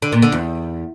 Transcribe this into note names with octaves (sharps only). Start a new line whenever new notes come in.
D3
A#2
D3
E2